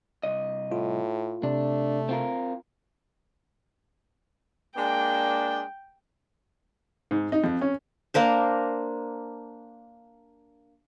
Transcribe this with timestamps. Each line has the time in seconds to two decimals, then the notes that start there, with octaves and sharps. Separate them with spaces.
0.23 C2 D#5
0.72 A2 F4
1.43 C3 A3 D4
2.09 C4 F4 A#4
4.77 G#3 A#3 D4 G5
7.11 G#2
7.32 D#4
7.44 F2
7.61 C#4
8.14 A#3 D4 A#4 C5